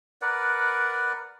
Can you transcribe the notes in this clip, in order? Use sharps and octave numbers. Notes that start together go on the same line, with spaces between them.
A#4 B4 D5 F#5